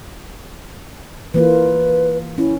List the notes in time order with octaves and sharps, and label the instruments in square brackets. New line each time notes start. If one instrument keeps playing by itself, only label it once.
[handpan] E3 A#3 F4 [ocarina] B4
[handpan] C#4 [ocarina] E4